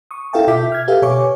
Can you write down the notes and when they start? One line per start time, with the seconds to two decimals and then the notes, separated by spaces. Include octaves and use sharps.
0.11 C#6 D#6
0.33 E4 A4 E5 F5 G5 A5
0.47 B2 F4 E5 D6 G6 B6
0.72 F6 G#6
0.88 G4 A4 B4 E5 F5
1.02 B2 C#5 G#5 C#6 D6